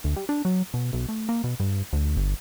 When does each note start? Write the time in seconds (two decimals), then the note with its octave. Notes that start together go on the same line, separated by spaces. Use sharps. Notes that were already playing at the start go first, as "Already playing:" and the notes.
0.04 D2
0.16 G3
0.29 D4
0.45 F#3
0.74 B2
0.93 B1
1.09 A3
1.29 A#3
1.44 B2
1.60 G2
1.93 D2
2.17 G1